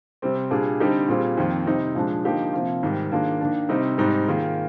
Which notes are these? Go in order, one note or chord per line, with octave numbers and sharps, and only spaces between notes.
C3 G3 C4
A#2 G3 D4 G#4
D3 G3 C4 D#4 G4
A#2 G3 C4 F4 G#4
F2 D#3 A#3 F4
C3 G3 C4 D#4
A#2 F3 G#3 D4
D3 F3 A#3 D#4 G4
C3 F3 A#3 F4
G#2 D#3 G3
D#3 A#3 D4 F4 G#4
D#3 A#3 D4
C3 G3 C4 D#4
G#2 G3 C4 D#4
D#3 A#3 F4 G#4